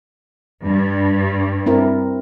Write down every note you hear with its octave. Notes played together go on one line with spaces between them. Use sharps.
G2
C4 E4 A#4